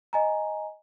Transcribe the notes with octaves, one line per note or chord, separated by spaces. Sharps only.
D#5 G#5 A#5